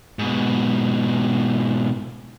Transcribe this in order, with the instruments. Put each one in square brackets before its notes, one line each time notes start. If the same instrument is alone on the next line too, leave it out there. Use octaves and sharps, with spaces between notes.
[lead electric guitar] G#2 B2